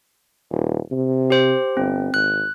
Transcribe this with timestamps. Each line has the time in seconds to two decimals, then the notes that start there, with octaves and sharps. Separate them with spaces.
0.51 D#1
0.92 C3
1.30 G4 C5
1.77 G1 C4
2.14 G#1 F#6